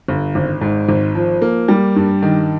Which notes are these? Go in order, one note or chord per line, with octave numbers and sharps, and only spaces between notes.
G1
G#1
G#2
G#1
F3
A#3
G3
G2
D#3